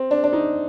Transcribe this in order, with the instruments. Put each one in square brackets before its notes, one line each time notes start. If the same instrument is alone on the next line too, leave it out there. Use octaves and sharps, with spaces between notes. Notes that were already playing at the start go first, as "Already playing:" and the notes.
Already playing: [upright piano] C4
D4
D4
D#4